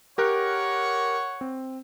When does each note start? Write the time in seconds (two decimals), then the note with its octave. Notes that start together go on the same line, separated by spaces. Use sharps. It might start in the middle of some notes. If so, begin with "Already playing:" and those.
0.18 G4 A#4 C#5 F#5 C#6 F#6
1.41 C4